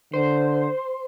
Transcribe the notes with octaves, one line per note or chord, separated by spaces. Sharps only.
D3 C5